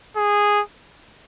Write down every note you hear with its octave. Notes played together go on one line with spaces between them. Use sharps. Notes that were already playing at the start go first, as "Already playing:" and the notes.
G#4